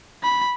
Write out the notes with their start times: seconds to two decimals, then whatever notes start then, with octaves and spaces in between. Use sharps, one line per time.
0.24 B5